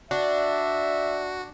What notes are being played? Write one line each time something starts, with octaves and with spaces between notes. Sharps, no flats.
D4 F#4 E5